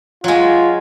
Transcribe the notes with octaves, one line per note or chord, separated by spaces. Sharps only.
F#3 G#3 F4